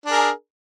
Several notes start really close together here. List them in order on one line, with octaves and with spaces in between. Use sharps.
D4 G#4 A#4